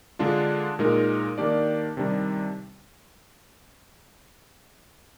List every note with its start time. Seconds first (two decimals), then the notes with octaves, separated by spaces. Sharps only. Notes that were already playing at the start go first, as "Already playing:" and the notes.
0.19 D3 G#3 D4 F4
0.79 A#2 G#3 D#4 A#4
1.38 D#3 A#3 D4 G4 D5
1.97 C3 D#3 G3 D4